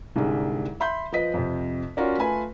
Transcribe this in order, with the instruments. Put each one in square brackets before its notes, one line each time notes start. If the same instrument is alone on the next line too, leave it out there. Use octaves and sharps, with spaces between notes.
[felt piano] C2 G#2 D3 G3 G#4
E5 B5 C6 G6
F3 B4 D#5 B6
F2 C3
C#4 F4 F#4 A#4 D5
A3 F4 B4 G#5 B5